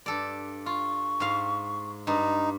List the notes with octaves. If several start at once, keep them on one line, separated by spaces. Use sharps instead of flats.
G2 A4 D5
F4 C#6
G#2 F5
G2 D#4